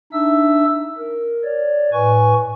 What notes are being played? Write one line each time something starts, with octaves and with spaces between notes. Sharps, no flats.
D4 D#4 E5 E6
A#4
C#5 D5
A2 B4 G#5 C#6